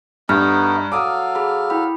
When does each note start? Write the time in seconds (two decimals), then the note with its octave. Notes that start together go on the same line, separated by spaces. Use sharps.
0.29 G2 A3 B3 D#4 A#5 F6
0.92 F#3 A4 F5 D6 D#6
1.35 G#4 B5
1.70 E4 G5 B5